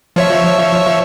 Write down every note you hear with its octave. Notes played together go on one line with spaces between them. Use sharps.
F3 C#5 E5